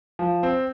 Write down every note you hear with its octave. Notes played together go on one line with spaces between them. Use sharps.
F3
C4